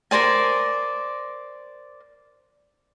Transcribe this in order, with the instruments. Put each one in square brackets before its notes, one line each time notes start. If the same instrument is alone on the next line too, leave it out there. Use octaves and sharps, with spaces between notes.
[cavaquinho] A#4 C5 D5 G#5